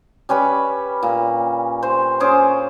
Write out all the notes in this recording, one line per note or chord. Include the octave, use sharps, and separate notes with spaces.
G3 C#4 B4 B5
A#2
C5
C#4 G#4 C5 D6